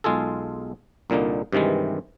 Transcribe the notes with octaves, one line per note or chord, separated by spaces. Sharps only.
B1 G#3 F4 G#4 A4
C2 A#2 D3 A#3 D#4
G2 C3 D#3 E3 G#3